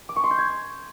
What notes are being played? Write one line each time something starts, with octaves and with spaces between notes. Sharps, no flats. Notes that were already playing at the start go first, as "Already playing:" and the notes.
D6
C#6
C6
G6
G#6